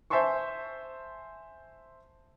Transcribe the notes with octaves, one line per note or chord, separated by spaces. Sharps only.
C5 E5 G#5 A5 C6 C#6